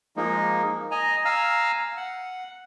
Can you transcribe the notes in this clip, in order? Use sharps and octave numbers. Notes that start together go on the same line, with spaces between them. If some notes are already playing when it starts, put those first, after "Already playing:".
F3 G#3 A#3 D#4
D#5 G#5 A#5
F5 G#5 A#5 E6 F6
F#5